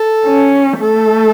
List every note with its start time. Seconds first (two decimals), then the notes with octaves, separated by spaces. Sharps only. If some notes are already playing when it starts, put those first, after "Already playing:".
Already playing: A4
0.26 C#4
0.80 A3 A4